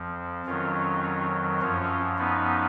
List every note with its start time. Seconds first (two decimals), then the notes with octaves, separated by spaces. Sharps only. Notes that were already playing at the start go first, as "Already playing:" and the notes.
Already playing: F2 F3
0.46 F2 D#3 F#3 C#4 F4
1.61 F#2 F3 C#4 F4
2.18 B3 D#4